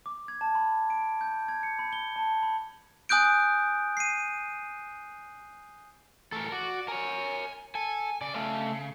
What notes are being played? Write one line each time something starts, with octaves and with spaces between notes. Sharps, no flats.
D6
G#6
A5
B5
D7
G6
G#6
C#7
B5
G7
A5
B5
G#5 D#6 F#6 G6 D7
C7 D#7
E3 A3 A4 A#4
F#4 D5
A#4 C#5 G#5
A4 G#5
C#3 D5
A3 F5